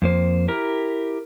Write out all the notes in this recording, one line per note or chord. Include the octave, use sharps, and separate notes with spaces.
F2 A#3 C5
E4 G4 A#4